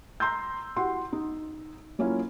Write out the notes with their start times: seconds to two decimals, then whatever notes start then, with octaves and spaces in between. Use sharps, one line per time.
0.20 A#5 C6 E6 G6
0.76 E4 F#4 G4 F#5 C6
1.13 D#4
1.99 F#3 A#3 C#4 E4 F4